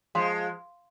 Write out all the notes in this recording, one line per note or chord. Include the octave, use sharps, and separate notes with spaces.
F3 G#3 F5 C6